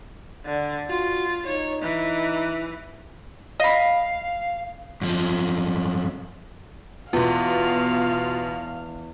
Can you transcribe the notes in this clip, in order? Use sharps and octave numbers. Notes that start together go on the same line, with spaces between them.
D3
F4 F#4
D#4 C#5
E3
D#5 F5 B5
F#2 F3
E2 B2 B3 F4 F5